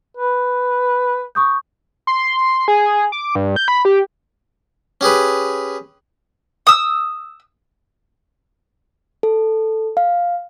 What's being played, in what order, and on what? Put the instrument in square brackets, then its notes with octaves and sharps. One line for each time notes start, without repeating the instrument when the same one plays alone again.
[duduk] B4
[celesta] C#6 D#6 G6
[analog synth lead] C6
G#4
D6
G2
G6
B5
G4
[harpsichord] C#4 G4 G#4 B4
[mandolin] D#6 E6
[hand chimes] A4
F5